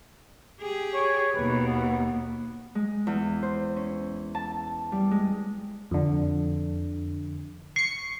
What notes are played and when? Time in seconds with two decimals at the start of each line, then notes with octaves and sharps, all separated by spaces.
0.60 G4 G#4
0.94 C#5
1.35 D#2 B2 B4
1.67 B3
2.75 G#3
3.07 E2
3.43 C5
3.77 C#4
4.35 A5
4.92 G3
5.11 G#3
5.91 F2 D3
7.76 C#6 C7 C#7